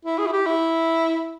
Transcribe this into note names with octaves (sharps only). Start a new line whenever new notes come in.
E4
G#4
E4
G4
E4